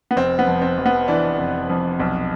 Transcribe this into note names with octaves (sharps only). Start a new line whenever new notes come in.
B3
F1 C4
B3
F2
C4
F1
B3
E3 D4
F1
F2
B1